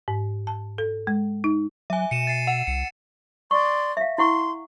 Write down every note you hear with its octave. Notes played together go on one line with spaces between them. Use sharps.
G#2
A5
A4
G#3
D#4
F#3 E5 G#5
B2 C#7 D#7 E7
A6 C7
F#5 E7
C2 C#7
D5 C6 C#6
E5 F5
E4 F#5 C6 C#6